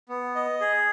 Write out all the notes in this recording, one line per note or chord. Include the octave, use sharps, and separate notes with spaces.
B3
D#5
G#4